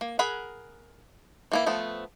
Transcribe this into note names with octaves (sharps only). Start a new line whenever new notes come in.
A#3
G#4 A#4 F#5 B5
E3 A#3 E4
F3 A3 B3